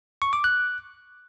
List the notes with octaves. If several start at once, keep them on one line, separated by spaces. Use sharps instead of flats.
C#6
D6
F#6